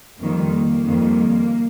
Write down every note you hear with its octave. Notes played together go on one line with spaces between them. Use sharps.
F2 D#3 G3 A#3
A#3
F2 D#3 G3